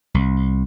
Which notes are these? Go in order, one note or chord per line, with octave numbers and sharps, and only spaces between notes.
C2